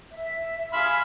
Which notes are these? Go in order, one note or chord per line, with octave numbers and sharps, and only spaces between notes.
E5
G#4 E5 F5 B5 C6